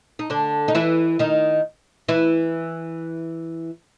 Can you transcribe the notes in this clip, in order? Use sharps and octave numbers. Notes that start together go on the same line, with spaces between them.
D#4
D3 D4
D#4
E3 E4
D#3 D#4
E3 E4